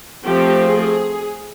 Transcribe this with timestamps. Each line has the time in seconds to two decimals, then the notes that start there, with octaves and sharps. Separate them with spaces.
0.24 F3 A3 C4 G4
0.65 G#4